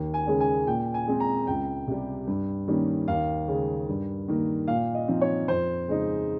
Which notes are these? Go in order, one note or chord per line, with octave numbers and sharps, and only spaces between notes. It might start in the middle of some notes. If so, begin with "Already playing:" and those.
Already playing: D#2
G#5
C#3 G#3 C#4
G#5
A#2 G5
G#5
G#3 C4
A#5
C#2 G5
C3 G3
G2
D#3 G3 A#3 C#4
D#2 F5
C#3 G#3
G2
D#3 A#3
A#2 F5
D#5
F3 C4 D#4
C#5
F2 C5
C#3 G#3 D#4